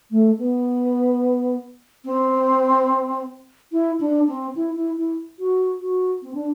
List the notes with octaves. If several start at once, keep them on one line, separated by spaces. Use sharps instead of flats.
A3
B3
C4
E4
D4
C4
E4
E4
E4
F#4
F#4
C4
D4